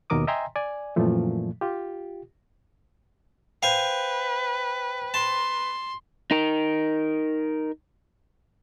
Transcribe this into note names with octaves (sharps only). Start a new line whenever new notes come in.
D#2 B2 D#3 A#4 D6 D#6
D#5 E5 G5 G#5 A#5 C6
D5 G#5
F#2 A#2 E3 F3 A3
F4 G4
B4 C5 F5 G5 G#5
A5 C6
D#4 A#4